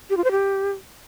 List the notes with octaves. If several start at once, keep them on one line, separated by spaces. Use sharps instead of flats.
G4
F4
C5
G4